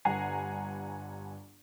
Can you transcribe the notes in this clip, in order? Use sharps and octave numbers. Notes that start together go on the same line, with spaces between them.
G1 G2 F#5 G#5 A#5 C7